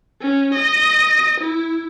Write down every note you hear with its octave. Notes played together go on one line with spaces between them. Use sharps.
C#4
D#5
E4